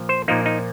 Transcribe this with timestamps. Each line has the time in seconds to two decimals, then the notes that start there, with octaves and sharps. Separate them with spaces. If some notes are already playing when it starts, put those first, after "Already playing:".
Already playing: A#2 F3
0.09 C5
0.28 A#2 F3 A#3 D#4
0.46 D#4